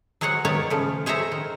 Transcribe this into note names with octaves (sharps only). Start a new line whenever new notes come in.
F#3 G#4 C5 C#5 F#5
D#3 B3 C#5 D5
A2 C#3 F3
G#4 C5 C#5 E5 A#5
D#3